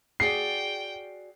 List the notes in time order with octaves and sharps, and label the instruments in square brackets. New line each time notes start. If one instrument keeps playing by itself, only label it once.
[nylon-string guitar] F#4 G#4 D5 [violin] G5 [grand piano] C7